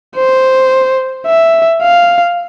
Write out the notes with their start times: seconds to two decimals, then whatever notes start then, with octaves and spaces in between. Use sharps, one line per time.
0.16 C5
1.27 E5
1.82 F5